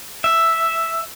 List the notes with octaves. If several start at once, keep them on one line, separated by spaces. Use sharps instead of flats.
E5